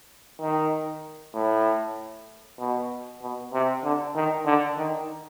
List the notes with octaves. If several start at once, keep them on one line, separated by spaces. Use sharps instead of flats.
D#3
A2
B2
B2
C3
D3
D#3
D3
D#3